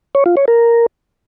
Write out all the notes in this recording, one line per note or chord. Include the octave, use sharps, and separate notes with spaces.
C#5
F4
C#5
A#4